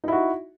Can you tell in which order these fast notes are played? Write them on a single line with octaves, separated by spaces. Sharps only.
D#4 E4 F#4